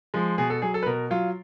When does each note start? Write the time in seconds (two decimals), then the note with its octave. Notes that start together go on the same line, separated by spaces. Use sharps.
0.14 F3 G#3
0.38 B2 G#4
0.50 A4
0.62 F#3 G#4
0.74 A4
0.83 B4
0.86 B2 A#4
1.10 F#3 F4